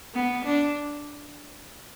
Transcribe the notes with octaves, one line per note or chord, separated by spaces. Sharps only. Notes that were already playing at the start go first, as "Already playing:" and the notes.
B3
D4